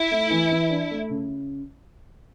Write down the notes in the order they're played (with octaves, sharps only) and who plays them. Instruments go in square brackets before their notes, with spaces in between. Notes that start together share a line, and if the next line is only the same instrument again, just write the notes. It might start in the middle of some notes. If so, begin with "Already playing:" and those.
Already playing: [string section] E4
[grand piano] A3
E3
E3
D4
A3
C#3